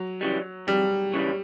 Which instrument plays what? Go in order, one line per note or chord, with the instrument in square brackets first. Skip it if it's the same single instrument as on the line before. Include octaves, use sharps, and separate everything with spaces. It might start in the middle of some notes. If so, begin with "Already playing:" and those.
Already playing: [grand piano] F#3
[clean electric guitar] C#3 E3 G3
[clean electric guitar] F2 [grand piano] G3
[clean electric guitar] C#3 E3 G3